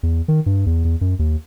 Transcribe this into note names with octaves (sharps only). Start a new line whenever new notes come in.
E2
D#3
G2
E2
E2
F#2
D#2